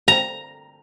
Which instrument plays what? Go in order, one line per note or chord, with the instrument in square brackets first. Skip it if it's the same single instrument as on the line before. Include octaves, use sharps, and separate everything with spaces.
[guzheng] A#5